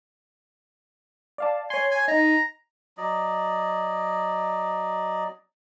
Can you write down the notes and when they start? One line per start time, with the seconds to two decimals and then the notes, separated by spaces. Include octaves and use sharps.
1.38 D5 F5 A5
1.70 C#5 G#5 C6
1.91 G#5
2.08 D#4 A#5
2.98 F#3 D5 D#5